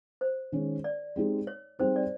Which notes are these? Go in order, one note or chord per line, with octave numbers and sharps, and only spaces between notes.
C5
D#3 G#3 C#4
D5
G#3 C4 D#4 G4
C#5
G3 C4 D#4 G#4 C5
D5